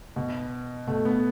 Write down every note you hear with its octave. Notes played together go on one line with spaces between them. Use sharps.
B2
B2 A3
B3